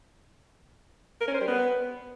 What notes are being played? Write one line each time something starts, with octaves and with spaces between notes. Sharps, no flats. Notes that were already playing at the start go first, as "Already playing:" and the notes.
A#4
C#4
C5
G3
B3